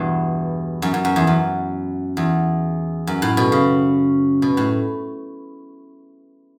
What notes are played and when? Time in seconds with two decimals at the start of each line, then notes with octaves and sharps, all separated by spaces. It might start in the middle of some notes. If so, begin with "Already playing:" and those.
Already playing: E2 G2 B2
0.82 F#2
0.94 F#2
1.05 F#2
1.16 E2
1.27 F#2
2.17 E2
3.07 F#2
3.22 A2
3.37 B2
3.52 C#3
4.42 B2
4.57 A2